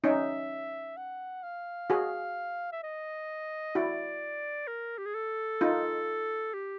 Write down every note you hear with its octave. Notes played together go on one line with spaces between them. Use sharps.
C#4 D#4 E5
F#5
F5
F#4 G#4
E5
D#5
E4 F#4 D5
A#4
G4
G#4
A4
D#4 F4
G4